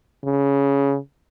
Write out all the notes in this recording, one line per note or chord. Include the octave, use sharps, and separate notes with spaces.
C#3